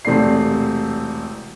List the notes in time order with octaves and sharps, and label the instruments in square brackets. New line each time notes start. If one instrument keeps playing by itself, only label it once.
[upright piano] E1 C3 A3 C4 D5 C7